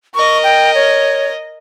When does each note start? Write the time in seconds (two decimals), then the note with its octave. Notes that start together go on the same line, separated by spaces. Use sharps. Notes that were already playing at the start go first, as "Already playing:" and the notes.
0.15 A#4 D#5 C#6
0.44 G5
0.75 C#5